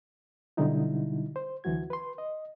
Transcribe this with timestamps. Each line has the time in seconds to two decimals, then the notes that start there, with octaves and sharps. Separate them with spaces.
0.57 B2 D3 F#3 G3 D#4 E4
1.36 C5
1.64 D2 E3 F#3 F#4 G#6
1.90 B4 C6
2.18 D#5